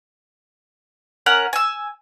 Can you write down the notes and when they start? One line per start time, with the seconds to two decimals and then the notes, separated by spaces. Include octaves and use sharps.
1.26 C#4 A#4 F#5
1.53 G#5 E6